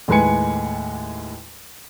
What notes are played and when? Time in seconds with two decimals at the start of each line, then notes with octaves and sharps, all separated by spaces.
0.08 D#2 A2 G#3 B4 G#5 C#7